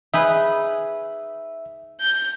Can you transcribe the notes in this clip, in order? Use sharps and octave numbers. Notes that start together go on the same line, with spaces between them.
D#4 G#4 B4 E5
G6